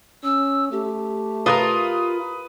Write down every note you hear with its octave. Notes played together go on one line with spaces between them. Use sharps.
C#4 E6
A3 G4
F4 F#4 A#4 B4 D#6